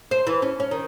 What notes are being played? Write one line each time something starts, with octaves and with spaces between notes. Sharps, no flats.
C5
E3
C#4
C#4
D#3